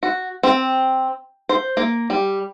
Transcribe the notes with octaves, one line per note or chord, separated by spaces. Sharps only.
F#4
C4
C5
A#3
G3